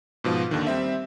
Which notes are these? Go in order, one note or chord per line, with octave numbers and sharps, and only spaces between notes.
G#2 B2 F3 F4
D#2 D3 D#3
G3 C4 E5